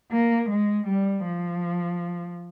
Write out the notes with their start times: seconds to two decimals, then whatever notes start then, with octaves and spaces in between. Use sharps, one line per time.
0.12 A#3
0.50 G#3
0.88 G3
1.25 F3